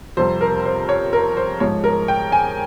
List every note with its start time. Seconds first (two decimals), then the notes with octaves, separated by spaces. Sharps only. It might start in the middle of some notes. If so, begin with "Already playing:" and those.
0.17 F2 C3 G3 C5
0.41 A#4
0.65 C5
0.89 C#5
1.13 A#4
1.37 C5
1.60 G#2 F3 G#3 C#5
1.84 A#4
2.08 G5
2.32 G#5